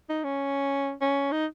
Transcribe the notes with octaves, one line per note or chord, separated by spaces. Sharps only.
D#4
C#4
C#4
D#4